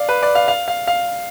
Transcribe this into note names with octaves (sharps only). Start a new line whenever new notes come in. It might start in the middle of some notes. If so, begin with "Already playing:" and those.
Already playing: D5 F5
B4
D5
F5
F5
F5
F5